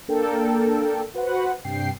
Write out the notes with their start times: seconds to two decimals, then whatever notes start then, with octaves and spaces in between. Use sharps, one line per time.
0.08 A#3 D4 A4 A#4 G5
1.14 F#4 B4 C5 F#5
1.65 G2 C3 G5 C7